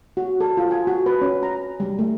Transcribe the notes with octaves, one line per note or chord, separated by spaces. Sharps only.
F#4
A4
F4
G#5
F#4
B4
C#4
A#5
G3
A3